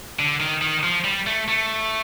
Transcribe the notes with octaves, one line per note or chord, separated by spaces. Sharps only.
D3
D#3
D#3
F3
G3
A3
A3